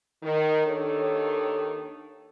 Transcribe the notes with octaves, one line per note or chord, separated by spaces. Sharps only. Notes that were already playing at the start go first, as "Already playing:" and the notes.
D#3
D#2 D#3 D4 A4 C#5